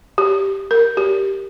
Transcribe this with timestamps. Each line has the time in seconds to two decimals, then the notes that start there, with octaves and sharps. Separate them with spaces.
0.18 G4
0.71 A#4
0.97 G4